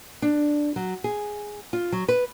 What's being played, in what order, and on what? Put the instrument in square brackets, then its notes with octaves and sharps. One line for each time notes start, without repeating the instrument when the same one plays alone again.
[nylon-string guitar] D4
F#3
G#4
F4
F#3
B4